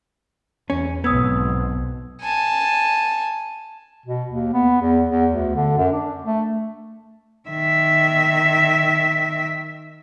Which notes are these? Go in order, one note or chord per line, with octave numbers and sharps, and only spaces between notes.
E2 C#4
B1 F2 G#2 B3 D#6 E6 G#6
G#5 A5
B2
D#2
B3
E2
E2
D2
D3
F#2
D4
A3
D#3 E5